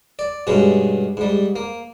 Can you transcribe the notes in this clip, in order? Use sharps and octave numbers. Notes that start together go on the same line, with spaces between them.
D5
G2 B2 G3 G#3 C#4
G#2 G3
A#3